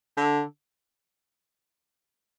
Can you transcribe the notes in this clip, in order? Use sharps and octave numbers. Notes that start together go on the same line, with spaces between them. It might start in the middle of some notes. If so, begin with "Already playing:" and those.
D3